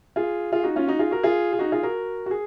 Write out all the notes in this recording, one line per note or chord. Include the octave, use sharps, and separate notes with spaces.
F4 G#4
F4 G#4
D#4 F#4
C#4 F4
D#4 F#4
F4 G#4
F#4 A#4
F4 G#4
G#4
D#4 F#4
F4 G#4
F#4 A#4
F#4
G#4